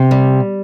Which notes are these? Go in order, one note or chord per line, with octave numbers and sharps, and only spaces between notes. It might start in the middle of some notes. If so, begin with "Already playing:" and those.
Already playing: C3
G3